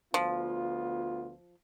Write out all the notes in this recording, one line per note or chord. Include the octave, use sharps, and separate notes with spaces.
D2 F3 B3 F4